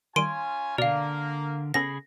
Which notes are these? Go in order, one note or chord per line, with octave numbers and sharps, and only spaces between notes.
D#3 G3 C#4 F4 G#5 C6 D7 D#7
B2 D3 A#3 A#4 D5 F5
C#3 B3 C#4 G#4 A4 B5 A#6